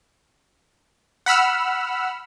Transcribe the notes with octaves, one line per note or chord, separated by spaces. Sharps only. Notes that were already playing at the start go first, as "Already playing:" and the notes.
F#5 B5 E6 F6